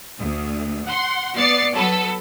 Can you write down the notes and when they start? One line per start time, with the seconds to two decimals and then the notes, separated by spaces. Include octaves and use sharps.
0.18 D2
0.86 F#5 C6
1.36 B3 D5 A6 C7 C#7
1.74 F#3 B3 A4 E6